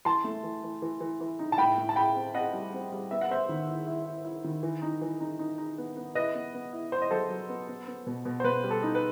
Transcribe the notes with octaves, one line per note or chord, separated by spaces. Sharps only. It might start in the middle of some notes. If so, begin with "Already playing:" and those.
E3 A5 C6
A3
E3
E3
E3
E3
E3
D#4
A5
A2 G5 B5
A2
A5
E4 G5 B5
C4
C4 D#5 F#5
G3
C4
G3
B3 E5
F#5
B3 C5 E5
D#3
E4
E4
E4
E4
D#3
E3
D#4
E3
D#4
D#4
D#4
B3
B3
E4 B4 D#5
B3
B3
E4
E4 C5
D#5
F#3 A4 C5
F#3
B3
B3
B3
B2
B2
C5
B2 B4
G3
A4
D#4
B4